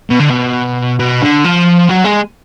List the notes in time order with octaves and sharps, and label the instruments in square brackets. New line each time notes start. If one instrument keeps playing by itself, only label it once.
[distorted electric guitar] B2
D3
B2
B2
D3
F3
F#3
G#3